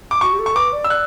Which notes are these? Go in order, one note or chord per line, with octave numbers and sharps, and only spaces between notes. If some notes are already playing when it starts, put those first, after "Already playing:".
D6
F#4 C#6
G4
A4
C#6
B4 D6
D5
E6
D5 F#6